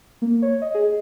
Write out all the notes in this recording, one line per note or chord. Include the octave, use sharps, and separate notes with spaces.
A#3
C#5
D#5
G#4